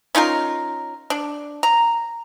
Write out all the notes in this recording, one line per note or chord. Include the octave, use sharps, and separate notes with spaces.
C#4 D#4 F4 A#4
D4
A#5